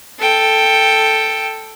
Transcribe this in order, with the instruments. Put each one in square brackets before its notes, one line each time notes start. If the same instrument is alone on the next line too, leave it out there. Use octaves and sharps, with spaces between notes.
[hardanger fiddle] A4 G5